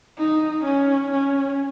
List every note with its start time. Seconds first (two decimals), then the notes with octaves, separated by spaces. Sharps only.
0.18 D#4
0.65 C#4
1.11 C#4